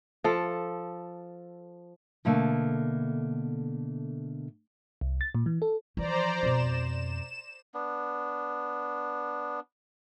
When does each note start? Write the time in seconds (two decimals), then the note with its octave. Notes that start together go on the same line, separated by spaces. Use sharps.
0.24 F3 A4
2.25 B2 D3 A3 A#3
5.01 C2
5.21 A6
5.35 A#2
5.46 E3
5.62 A4
5.97 E3 F3 C5 D5 A#5
6.43 F2 B2 E7
7.74 B3 D4